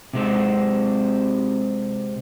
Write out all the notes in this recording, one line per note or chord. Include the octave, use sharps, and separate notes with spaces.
C3 G#3 C4